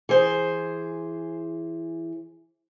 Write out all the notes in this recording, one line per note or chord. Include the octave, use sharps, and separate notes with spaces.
E3 G#4 C5